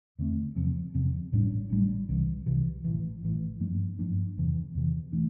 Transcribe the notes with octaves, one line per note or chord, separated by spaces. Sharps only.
E2 D3 A3 C4
E2 C3 F3 C4
E2 C3 F3 C4
A1 A2 G3 D4
A1 A2 G3 D4
C2 C3 E3
C2 C3 E3
A1 A2 E3
A1 A2 E3
G2 F3 A#3 D4
G2 F3 A#3 D4
E2 C3 E3
E2 C3 E3
E3 A3 D4